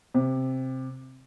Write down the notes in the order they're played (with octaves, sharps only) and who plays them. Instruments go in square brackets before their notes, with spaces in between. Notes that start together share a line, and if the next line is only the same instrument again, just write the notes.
[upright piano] C3